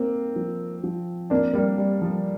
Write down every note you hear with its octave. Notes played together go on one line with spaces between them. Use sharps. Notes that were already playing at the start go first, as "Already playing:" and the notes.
Already playing: A#3 C4
F3
F3
A#3 C4 D4
G3 A#3
G3
F3